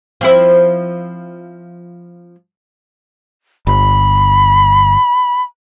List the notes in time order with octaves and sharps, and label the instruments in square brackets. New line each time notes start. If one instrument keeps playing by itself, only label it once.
[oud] F3 C4 E4
[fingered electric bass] G1 [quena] B5